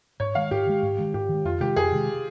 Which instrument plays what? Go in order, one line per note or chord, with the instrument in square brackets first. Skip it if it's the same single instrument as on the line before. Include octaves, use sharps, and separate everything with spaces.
[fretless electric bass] G#2 [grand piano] C#5
[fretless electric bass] D#3 G#3 [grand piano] F5
[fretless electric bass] G#2 [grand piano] G4
[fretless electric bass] D#3 G#3
G#2
D#3 G#3
[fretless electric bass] G#2 [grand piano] G4
[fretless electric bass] D#3
G#3
[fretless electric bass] F2 [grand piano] F4
[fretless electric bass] C3 D#3 G#3 [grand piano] G4
[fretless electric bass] F2 [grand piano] G#4
[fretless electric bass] C3 D#3 G#3